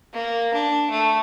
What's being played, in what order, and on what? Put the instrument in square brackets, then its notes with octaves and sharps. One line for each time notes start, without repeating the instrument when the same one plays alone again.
[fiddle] A#3
D4
A3